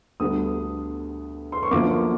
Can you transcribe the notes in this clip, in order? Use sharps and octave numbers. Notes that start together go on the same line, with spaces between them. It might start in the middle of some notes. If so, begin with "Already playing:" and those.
D2 D3 G3 B3 D#6
C6
C#6
F#2 D3 F3 A#3 D6